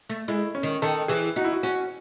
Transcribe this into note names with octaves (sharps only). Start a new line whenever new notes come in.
A3
G#3 E4
C#4
D#3
D#3 A4
E3 G#4
D#4 F#4
E4
F#4
C#4 F#4